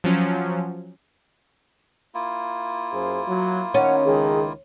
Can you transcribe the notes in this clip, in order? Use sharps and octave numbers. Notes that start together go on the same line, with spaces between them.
F3 F#3 C#4
A#3 E4 F4
F#2 G#4 C5
F#3
D#3 C#4 D#4 F#5
C#2 D#3 G#4